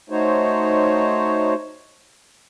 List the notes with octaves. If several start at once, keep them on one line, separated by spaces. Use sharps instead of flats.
A3 D#4 F#4 C5 C#5